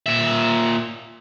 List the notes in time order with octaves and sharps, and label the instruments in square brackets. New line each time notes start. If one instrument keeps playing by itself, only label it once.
[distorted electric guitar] A#2 E5